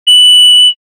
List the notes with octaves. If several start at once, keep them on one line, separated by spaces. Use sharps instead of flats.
F#7